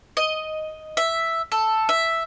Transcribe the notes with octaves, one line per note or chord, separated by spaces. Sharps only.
D#5
E5
A4
E5